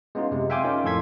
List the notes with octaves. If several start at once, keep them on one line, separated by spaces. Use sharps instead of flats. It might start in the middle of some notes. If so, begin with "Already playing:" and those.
G#3 B3 C#4 D#4 F4
F#2 C3 G#3
E5 F5 G5 G#5 C6 D6
C#4 D#4 F4 A#4
F2 A2 A4 C6 G#6 B6